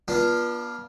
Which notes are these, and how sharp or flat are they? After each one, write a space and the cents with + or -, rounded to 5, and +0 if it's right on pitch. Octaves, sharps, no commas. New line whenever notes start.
B3 -40 D4 +0 F4 +0